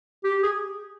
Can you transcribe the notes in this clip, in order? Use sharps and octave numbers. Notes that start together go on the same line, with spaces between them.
G4
G#4